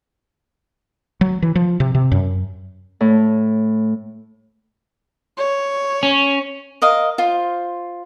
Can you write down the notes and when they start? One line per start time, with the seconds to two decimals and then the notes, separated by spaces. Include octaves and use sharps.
1.21 F#3
1.42 E3
1.56 F3
1.80 C3
1.95 C3
2.12 F#2
3.01 A2
5.38 C#5
6.03 C#4
6.82 A#4 D#5 F5
7.18 F4 C5